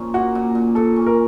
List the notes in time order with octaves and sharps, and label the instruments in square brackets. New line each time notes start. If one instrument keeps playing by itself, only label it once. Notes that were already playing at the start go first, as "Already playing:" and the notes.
Already playing: [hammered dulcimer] A#2 F3 C#4
[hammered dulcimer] A#3 [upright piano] F#4
[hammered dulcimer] A#2
A#2
[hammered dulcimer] A#2 [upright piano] A4
[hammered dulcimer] C#4
[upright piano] A#4